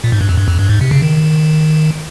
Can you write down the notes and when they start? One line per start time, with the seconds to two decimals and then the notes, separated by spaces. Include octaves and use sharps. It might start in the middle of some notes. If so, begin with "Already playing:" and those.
0.04 A#2
0.12 G#2
0.21 G2
0.29 F2
0.37 G2
0.48 F2
0.59 G2
0.69 G#2
0.81 C3
0.91 C#3
1.02 D#3